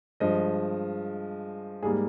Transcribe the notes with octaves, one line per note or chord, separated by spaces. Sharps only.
G2 F3 G#3 D#5
G#2 G3 A#3 G#4